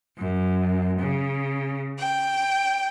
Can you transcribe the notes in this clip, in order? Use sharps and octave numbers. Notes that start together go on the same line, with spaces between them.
F#2
C#3
G5